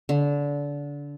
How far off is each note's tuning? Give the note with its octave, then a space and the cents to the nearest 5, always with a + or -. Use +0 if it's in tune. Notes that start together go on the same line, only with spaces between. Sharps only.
D3 -25